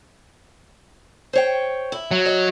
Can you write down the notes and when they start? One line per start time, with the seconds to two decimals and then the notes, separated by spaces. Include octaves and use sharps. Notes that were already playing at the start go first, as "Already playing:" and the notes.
1.33 C5 C#5 G5
1.92 E4
2.11 F#3
2.26 D#5